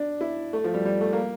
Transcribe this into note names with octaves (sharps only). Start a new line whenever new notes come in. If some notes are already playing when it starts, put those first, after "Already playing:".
Already playing: D4
E4
A3
F3
G3
G3
A3
A#3